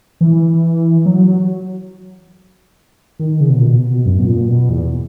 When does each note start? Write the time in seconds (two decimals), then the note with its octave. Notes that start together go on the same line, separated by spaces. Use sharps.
0.21 E3
1.06 F#3
1.27 F#3
3.20 D#3
3.40 C#3
3.50 B2
3.58 A#2
3.66 B2
4.05 F#2
4.19 B2
4.26 A#2
4.48 B2
4.69 E2